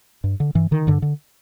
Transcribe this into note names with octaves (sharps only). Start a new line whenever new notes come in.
G2
D3
G2 E3
D3 D#3
G2 D3
D3